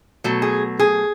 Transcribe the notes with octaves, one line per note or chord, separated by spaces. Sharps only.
B2 F#3 A3
G#4
G#4